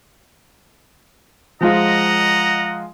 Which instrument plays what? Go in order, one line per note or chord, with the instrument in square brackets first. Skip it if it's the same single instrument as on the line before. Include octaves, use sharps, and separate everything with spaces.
[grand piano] F3 G#3 F4 [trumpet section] D#5 F#5 A#5